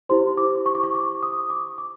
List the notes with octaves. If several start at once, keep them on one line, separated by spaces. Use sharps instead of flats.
E4 G4 C5 C6
D6
C#6
D6
C#6
D6
D#6
D6
D6